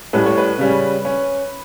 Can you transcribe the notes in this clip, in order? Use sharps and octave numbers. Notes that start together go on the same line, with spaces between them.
A2 G3 C#4 B4
C#5
B4
C#3 G3 C#4
C#4